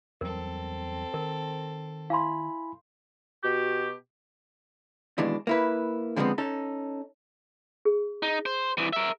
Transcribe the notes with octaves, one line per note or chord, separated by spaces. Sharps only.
E2 F#3 G3 C4 A4 A#4
D#3 A#4
E4 F5 G#5 B5 C6
B2 F#4 G4
D#2 B2 E3 G#3 D4
A#3 E4 B4
A#2 D3 F3 G#3 B3 C4
C#4 D#4 A4
G#4
D#4
C5
C2 E3
A#4 E5